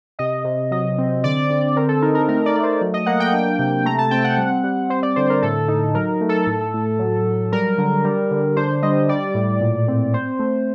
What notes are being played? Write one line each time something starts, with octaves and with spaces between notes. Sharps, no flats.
C3 D#5
C3
F#3 D#5
C4
D3 D5
D3
C4 A#4
A4
D#4 A#4
A#4
A3 A#4
D5
A3
C5
F#3
D#5
A#3 F#5
G5
D4
C3
A3 A#5
A5
C4 G5
F#5
G3
G3
C4 C5
D5
D3 C5
A#4
A2 A4
D#4
F#3 A#4
A3
A4
A2
A2
F#3
F#3
G3 A#4
D3
G3
D3
D4 C5
G3 D#5
G3 D5
A2
A#2
C4
C4 C5
A3